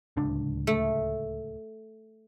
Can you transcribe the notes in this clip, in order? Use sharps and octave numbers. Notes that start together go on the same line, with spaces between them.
D1 C#2 D4
A3